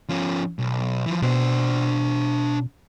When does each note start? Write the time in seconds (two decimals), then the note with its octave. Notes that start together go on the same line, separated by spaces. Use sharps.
0.09 F3 C#4
0.59 B1
1.06 E3 F3
1.22 B2 D4 C5